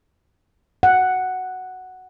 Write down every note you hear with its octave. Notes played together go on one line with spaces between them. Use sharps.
F#5